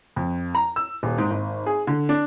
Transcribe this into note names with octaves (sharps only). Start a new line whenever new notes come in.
F2
A#5
E6
D#1
G#2
G#1
G#4
D3
D4